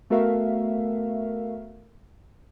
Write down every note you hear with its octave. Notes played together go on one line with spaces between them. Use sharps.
A3 B3 F#4 A#4 E5 F5